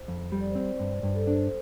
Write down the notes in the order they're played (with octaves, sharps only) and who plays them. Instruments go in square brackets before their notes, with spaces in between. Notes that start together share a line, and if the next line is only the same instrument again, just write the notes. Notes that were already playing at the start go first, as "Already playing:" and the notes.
Already playing: [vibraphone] C5
[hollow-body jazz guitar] F2
G3
[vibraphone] D5
C5
[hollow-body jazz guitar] C4 [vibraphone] D5
[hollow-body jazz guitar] G2
G2
[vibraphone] A4
[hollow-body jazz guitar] D4 [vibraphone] C5